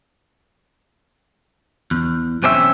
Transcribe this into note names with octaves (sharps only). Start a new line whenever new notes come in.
E2
B1 C3 C4 C#4 G4 E5